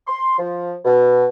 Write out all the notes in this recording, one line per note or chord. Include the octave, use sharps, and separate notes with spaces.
C6
F3
B2